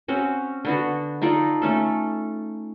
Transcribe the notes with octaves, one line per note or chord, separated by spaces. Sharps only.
C4 C#4 F#4
D3 B3 F#4
D#4 F4 A4 D5
A3 C#4 A4